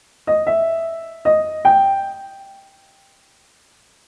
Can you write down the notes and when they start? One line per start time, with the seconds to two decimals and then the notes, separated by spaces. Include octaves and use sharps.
0.27 D#5
0.47 E5
1.25 D#5
1.65 G5